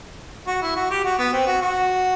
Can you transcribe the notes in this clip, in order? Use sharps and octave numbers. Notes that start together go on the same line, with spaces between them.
F#4
E4
F#4
G4
F#4
B3
C4
F#4
F#4